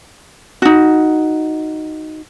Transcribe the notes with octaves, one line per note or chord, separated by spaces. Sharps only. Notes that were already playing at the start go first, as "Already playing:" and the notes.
D#4 F#4